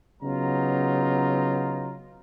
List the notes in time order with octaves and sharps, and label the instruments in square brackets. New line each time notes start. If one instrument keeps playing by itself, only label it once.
[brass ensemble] C#3 F#3 B3 D#4 F4 A#5